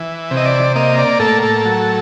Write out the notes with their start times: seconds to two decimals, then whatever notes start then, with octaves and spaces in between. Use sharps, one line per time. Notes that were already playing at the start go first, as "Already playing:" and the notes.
Already playing: E3
0.31 C3
0.37 D#5
0.45 D5
0.75 A#3 D#5
0.98 D5
1.20 A2 A4
1.42 A4
1.65 F#3